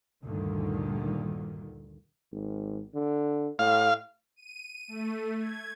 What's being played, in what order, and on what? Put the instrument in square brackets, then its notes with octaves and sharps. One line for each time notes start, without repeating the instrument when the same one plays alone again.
[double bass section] D2 G2 A#2 D3 D#3
[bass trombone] G#1
D3
[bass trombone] A2 [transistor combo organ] F5
[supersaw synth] D#7
A3
G#6